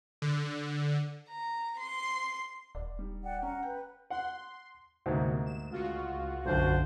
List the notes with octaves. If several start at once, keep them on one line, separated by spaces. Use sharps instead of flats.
D3
A#5
C6
D#1 D5
G3 D#4
D5 F#5 G5
C#4 F#5 A#5
B4 G5
F#5 C6
D2 G#2 C3 A#3
E7
C#2 F4 F#4
B1 F#2 D3 F#3 D4 C5